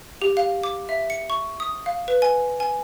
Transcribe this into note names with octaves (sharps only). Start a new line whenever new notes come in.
G4
F5
D6
E5
C#7
C#6
D#6
F5
B4
G#5
G#5